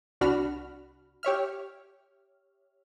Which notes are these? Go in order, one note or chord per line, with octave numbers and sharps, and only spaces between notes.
C2 D4 F#4 B5 F6
G4 C#5 E5 F6